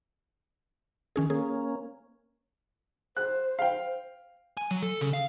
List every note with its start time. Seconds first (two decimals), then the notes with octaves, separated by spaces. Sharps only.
1.16 D#3 C#4 G#4
1.30 A#3 C#4 G#4
3.17 C5 F#6
3.59 F5 G5
4.57 G#5
4.71 F#3
4.82 A4
5.01 C#3
5.13 F5